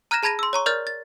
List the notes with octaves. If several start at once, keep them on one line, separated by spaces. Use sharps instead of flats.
A#5 F6 F#6 G#6 A#6 E7
G#4 A5 B5 G#6 A#6 D#7
C6 E6
C#5 A#5 C#6
A#4 D5 F6 G6 A6
A6